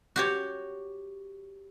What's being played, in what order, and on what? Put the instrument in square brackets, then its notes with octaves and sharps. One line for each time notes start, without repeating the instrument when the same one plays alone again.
[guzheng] F#4 G4 C#5